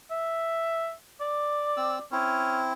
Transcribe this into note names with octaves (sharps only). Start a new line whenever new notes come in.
E5
D5
C4 E6
C4 C#4 E4